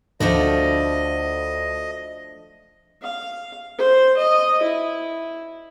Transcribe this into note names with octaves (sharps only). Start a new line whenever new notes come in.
D2 F3 A3 D4 D#5
F5
C5
D#5
E4